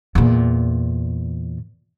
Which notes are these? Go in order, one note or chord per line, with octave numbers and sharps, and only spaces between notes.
E2 A#2